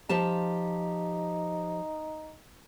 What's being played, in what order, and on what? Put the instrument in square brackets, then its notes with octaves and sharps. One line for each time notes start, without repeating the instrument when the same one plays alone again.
[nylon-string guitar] F3 G4 A5 [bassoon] D#4